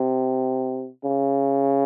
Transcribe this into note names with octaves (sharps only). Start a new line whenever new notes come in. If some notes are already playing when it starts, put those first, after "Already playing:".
Already playing: C3
C#3